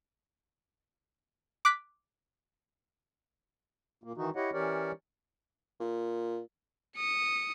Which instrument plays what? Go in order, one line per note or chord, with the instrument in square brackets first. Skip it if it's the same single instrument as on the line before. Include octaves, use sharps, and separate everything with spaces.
[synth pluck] D6 F#6 B6
[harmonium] A#2 A#3
D#3 E3 D#4 F#4
E4 G4 C#5 D#5 F#5
E3 C#4 G4 A#4 C#5 D5
[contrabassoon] A#2
[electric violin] D#6 C#7